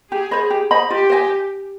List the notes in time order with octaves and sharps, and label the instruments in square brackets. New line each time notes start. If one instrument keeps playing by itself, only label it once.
[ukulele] G4 [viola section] G#4
[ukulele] C5 D#5 B5
G4
C5 D#5 B5
[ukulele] F4 [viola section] G4
[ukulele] C5 D#5 G#5